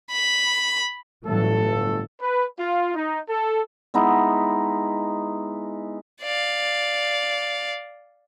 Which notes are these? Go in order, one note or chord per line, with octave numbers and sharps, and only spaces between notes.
B5
G1 A2 E3 F#3 A3 A4
B4
F4
D#4
A4
G#3 B3 D#4 E4
D5 F5